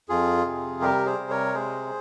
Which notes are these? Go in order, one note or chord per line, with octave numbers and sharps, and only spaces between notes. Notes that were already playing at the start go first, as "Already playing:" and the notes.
F2 F4 G#4
C3
G3 G4 A#4
G#4 C5
C3
A#4 C#5
G#3 G#4 C5